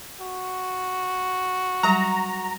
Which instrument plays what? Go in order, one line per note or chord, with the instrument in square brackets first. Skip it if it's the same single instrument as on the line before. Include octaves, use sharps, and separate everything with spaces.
[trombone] F#4
[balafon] F#3 G3 [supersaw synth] A#5